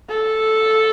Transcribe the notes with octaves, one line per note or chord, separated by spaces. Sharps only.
A4